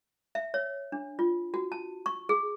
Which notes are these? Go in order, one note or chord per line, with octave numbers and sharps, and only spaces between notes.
E5
C#5
D4
F4
F#4
A5
C#6
G#4